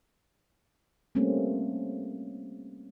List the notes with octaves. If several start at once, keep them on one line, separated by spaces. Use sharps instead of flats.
G3 A3 A#3 C4 C#4